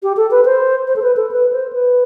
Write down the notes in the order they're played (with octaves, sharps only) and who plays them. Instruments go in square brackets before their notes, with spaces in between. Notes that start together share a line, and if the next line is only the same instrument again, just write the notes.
[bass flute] G4
A4
B4
C5
C5
A4
B4
A4
B4
C5
B4